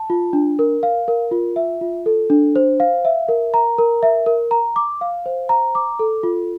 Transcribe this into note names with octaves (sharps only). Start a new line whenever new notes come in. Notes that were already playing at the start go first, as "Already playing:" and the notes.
Already playing: A5
F4
D4
A#4
F5
A#4
F4
E5
F4
A4
D4
C5
F5
E5
A#4
A#5
A#4
E5
A#4
A#5
D6
F5
C5
A#5
D6
A4
F4